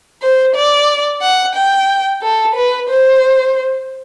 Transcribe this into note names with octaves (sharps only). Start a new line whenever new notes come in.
C5
D5
F#5
G5
A4
B4
C5